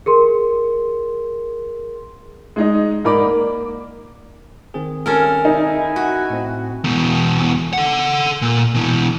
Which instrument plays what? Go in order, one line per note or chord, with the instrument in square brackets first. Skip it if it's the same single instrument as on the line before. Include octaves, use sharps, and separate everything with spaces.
[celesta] G#4 A#4 C6
[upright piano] G#3 D#4 D#5
G#2 D#4 A#4 D5 B5 D6
A#3
[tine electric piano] D#3 C4 G#4
[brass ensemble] G2 [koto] C#4 A4 A#4
[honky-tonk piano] D#4 [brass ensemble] E4 G#5
[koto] F#4
[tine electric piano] A2 C4
[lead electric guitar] E2 B2
A4 F#5
A#2
B2 E3